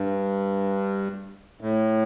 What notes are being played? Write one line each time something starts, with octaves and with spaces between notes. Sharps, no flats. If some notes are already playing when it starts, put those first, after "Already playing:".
Already playing: G2
A2